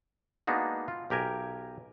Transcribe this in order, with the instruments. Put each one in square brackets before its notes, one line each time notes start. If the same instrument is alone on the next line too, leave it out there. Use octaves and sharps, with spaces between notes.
[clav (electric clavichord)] G#3 A#3 B3 D4 D#4 F#4
F4
B1 G4 A#4 G#5